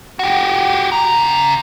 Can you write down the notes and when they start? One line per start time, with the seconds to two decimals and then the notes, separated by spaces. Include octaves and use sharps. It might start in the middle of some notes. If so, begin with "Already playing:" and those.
0.19 F#4 G4
0.92 C#3 A#5